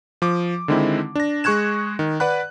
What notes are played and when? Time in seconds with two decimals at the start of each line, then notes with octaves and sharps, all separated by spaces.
0.22 F3 D6
0.68 D3 D#3 G#3 C4 D#4 E4
1.15 D4 A#6
1.44 G#3 G#4 C#6 F#6 G#6 E7
1.99 D#3
2.20 B4 D5 F#5 B5 F#6